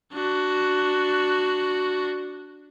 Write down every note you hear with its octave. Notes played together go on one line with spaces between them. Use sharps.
D4 F#4